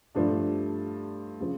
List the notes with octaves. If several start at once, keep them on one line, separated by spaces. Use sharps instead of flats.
G2 F3 A3 D4
C#3 F3